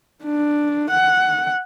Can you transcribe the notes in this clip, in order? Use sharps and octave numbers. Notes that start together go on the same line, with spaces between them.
D4
F#5